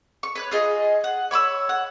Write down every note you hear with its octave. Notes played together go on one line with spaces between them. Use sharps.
C#6
B4 C#5 F#6
F4 G#4 D#5
F#5
C#5 B5 C#6 E6
F#5